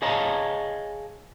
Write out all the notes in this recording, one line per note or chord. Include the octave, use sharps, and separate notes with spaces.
G#4 C#5 D#5 F5 A5 A#5